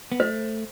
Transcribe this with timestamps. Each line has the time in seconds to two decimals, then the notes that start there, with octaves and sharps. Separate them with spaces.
0.12 B3
0.20 A3 C5